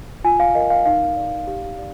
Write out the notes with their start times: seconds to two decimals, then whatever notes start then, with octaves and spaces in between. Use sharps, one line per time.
0.24 F4 G#5
0.40 F5
0.55 A#4 D#5
0.70 F5
0.86 D#4 F5
1.16 D5
1.47 G4
1.78 D5